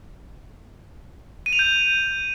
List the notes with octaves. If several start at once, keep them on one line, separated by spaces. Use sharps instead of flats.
D#7
F7
G6